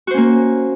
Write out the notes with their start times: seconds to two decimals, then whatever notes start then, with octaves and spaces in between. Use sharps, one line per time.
0.07 F#4
0.11 C5
0.14 C#4
0.17 A#3